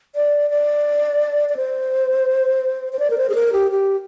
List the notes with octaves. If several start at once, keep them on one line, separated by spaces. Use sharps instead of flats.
D5
D5
D5
C5
C5
D5
A#4
C5
G#4
A#4
G4
G4